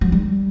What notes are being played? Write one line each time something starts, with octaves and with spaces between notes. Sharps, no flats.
F#3
G3